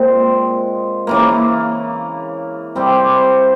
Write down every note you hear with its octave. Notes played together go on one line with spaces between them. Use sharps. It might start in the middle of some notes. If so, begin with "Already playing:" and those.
Already playing: A#2 G#3 C4
C#3 E3 A#3
C3 G3 C4 G4